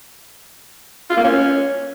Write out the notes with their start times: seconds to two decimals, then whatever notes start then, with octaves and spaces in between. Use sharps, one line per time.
1.10 F4
1.17 A#3
1.24 C#4